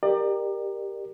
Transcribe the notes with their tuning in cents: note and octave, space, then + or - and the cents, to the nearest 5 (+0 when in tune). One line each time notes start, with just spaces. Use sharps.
G4 +5 A#4 +0 D5 +35